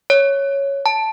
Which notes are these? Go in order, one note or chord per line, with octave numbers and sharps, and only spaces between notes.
C#5
A5